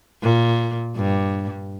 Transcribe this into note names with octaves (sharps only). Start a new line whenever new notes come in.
A#2
G2